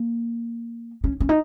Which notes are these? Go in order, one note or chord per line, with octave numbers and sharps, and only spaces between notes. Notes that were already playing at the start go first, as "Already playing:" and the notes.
Already playing: A#3
C#4
C#4
D#4